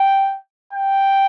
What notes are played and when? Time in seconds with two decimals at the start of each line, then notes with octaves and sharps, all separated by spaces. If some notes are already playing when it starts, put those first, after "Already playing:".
Already playing: G5
0.73 G5